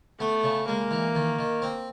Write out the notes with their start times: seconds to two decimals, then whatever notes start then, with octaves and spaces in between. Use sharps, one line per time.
0.20 A3 B3
0.44 C#3
0.67 G#3 A#3
0.91 E3
1.15 D#3
1.39 D#3
1.62 C4